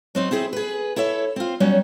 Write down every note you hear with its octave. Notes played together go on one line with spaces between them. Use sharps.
F#3 C4 D#4
C4 E4 G#4 A#4 C5
G#4 B4
E4 A4 C#5 E5
C4 F4
F#3 G3 B3 C#4 F#4